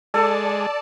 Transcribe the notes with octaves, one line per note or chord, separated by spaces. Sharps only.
G#3 A4 D5 A5